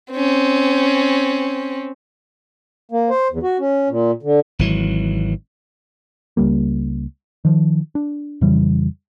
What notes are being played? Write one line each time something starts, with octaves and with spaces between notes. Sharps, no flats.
C4 C#4
A#3
C5
E2
F#4
C#4
A#2
D3
G#1 E3 F#3
C#2 G3 A#3
D#3 F3
D4
F2 C#3 E3 G3